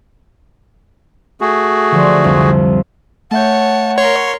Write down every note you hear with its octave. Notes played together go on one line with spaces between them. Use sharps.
A3 F#4 G#4
D3 F3
C2 F2
A3 C#5 E5 F#5 A5 G6
A#4 C#5 C6